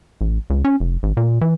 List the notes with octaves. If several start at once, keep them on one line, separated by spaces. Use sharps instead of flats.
A1
C#2
C#4
F1
G#1
A#2
E3